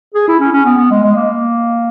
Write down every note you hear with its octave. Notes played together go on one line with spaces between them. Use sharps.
G#4
E4
C#4
C#4
B3
B3
G#3
G#3
A#3